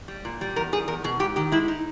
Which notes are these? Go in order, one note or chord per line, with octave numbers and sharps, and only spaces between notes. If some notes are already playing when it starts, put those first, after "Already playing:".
G3
A#2
G3
E2 A#4
G3 G#4
E2 A#4
B2 G#4
G#2 G4
D#3 G4
G#3 E4
D#4